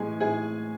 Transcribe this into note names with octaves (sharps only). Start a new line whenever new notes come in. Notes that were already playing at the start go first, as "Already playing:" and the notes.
Already playing: A2 E3 G#3 G#4 G#5
A2 G#4 G#5